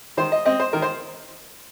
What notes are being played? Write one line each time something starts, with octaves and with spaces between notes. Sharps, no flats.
D#3 C5
D#5
C4 D#5
C5
D#3 A#4
C5